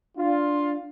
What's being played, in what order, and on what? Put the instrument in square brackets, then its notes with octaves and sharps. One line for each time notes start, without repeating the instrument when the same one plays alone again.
[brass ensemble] D4 F4